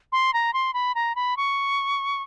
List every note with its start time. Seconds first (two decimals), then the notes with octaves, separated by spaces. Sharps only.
0.12 C6
0.34 A#5
0.54 C6
0.74 B5
0.95 A#5
1.16 B5
1.37 C#6